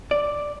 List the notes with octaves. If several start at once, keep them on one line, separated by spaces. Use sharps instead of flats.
D5